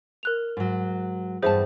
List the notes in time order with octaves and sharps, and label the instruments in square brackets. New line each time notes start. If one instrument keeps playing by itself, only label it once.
[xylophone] A#4 F#6 F7
[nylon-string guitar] G#2 F#3
[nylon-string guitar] E2 G2 A5 [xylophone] G#4 C5 E5